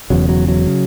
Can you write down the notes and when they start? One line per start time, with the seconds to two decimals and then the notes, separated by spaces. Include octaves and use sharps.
0.10 E1 E2 C#3 F#3
0.29 F#3
0.48 F#3
0.67 C#3